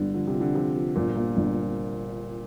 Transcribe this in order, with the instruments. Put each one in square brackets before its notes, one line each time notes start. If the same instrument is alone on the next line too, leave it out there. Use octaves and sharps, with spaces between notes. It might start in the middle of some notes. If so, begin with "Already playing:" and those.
Already playing: [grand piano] G1 G2 [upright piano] D3
[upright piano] D3 [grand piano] F3
[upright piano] C3
[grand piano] F3
[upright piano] D3
[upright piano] C3 [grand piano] F3
[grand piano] F3
[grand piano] G1 [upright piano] A#2
[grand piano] A#3
G1